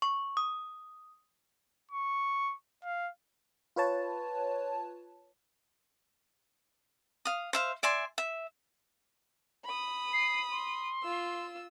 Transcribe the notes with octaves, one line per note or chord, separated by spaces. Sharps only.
C#6
D#6
C#6
F5
F4 B4 C#5 A5
F5 D#6
C5 E5 F5
D5 E5 G#5 C6
E5
B5 D#6
C7
C6
F4 E6